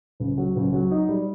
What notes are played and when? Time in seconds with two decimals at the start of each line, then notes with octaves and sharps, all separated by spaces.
0.20 C#2
0.38 F#3
0.56 C#2
0.73 F#3
0.91 D#4
1.09 G3